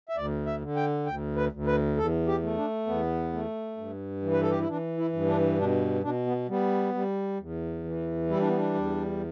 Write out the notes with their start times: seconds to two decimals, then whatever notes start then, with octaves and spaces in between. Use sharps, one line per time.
0.09 E5
0.16 D2 D5
0.46 E5
0.61 D3
0.76 G5
1.06 D2 G5
1.36 B4
1.52 D2
1.67 B4
1.97 E2 A4
2.27 G4
2.42 A3
2.57 D4
2.87 E2 B3
3.33 A3
3.77 G2
4.22 E3
4.32 B4
4.42 A4
4.51 G4
4.59 E4
4.68 E3 D4
4.97 E4
5.13 G2
5.28 D4
5.58 B2 D4
6.03 B2 D4
6.26 B3
6.49 G3 B3
6.94 G3
7.39 E2
7.84 E3
8.29 G3 E4
8.39 D4
8.47 B3
8.57 D4
8.74 E2